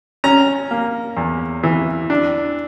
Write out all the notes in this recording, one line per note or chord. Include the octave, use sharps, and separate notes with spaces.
C#4 A#5
A#3
E2
E3
D4